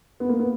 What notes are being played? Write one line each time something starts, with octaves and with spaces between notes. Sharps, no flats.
B3
A#3
B3